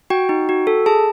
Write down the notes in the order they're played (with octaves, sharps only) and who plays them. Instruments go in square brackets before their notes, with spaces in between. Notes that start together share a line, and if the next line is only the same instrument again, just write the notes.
[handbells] F#4 G5
D#4
F#4
A4
G#4 A5